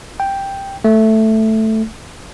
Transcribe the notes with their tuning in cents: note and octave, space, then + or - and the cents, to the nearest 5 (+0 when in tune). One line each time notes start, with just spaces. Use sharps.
G5 +5
A3 +0